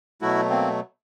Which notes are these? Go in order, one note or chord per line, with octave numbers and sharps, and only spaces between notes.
B2 F#3 A3 E4 F#4
A#3 C4